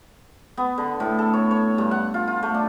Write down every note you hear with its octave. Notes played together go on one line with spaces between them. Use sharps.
B3
D3
A2
A4
C#5
C#5
G2
F#5
F4
F4
A3
D4